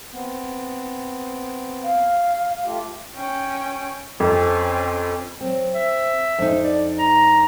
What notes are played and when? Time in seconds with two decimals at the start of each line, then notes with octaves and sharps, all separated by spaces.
0.13 B3 C4
1.84 F5
2.65 A3 F4 G4
3.15 C#4 G5
4.20 F2 C4 C#4
5.41 F#3 C4
5.74 E5
6.38 F2 D4 D#4
6.63 D5
6.99 A#5